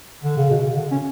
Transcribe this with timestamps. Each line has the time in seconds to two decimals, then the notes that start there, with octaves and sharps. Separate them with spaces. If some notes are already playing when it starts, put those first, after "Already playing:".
0.23 D3
0.37 C#3
0.51 B2
0.63 C#3
0.77 D3
0.91 C#4